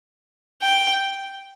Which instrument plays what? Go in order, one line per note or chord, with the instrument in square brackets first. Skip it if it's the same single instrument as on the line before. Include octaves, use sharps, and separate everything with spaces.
[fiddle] G5